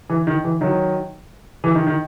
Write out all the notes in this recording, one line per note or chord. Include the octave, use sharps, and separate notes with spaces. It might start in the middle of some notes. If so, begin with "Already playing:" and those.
E3
D#3
E3
D#3 F#3
E3
D#3
D#3